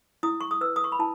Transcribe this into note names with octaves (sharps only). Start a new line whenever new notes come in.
E4 D#6
C#6
D#6
B4 E6
D#6
C#6
B5
E4 A5